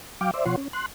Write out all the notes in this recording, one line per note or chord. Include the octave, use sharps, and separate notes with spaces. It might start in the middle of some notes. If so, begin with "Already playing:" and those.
F#3 F5 G5 D6
C5 D5 E5
B2 F3 F4 C#5 F#5 C6
C#4
C6 F#6